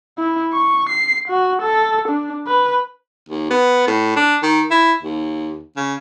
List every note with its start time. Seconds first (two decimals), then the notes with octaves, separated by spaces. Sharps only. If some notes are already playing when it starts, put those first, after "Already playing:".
0.18 E4
0.53 C#6
0.90 C7
1.28 F#4
1.62 A4
2.08 D4
2.47 B4
3.29 D#2
3.50 B3
3.87 A2
4.16 D4
4.43 D#3
4.71 E4
5.02 D#2
5.76 C#3